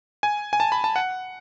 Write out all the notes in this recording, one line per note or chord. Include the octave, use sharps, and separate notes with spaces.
G#5
G#5
A5
B5
A5
F#5